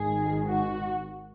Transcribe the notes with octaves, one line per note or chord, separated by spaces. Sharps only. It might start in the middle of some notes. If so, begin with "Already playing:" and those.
Already playing: G#1 G#2 D#3 G#4
F#4